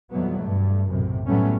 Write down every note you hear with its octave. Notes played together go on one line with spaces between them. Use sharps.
F2 B2 E3 F#3 G3 B3
G2 A3
B1 F#2 A2 C3
A2 F#3 G3 A3 B3 C#4